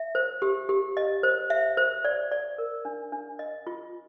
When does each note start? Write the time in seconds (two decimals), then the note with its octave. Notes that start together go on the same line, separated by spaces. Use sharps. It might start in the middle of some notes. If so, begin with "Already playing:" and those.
Already playing: E5
0.15 C5
0.42 G4
0.69 G4
0.97 D#5
1.23 C5
1.50 E5
1.77 C5
2.05 D5
2.32 D5
2.58 A#4
2.85 D4
3.12 D4
3.39 D#5
3.67 F4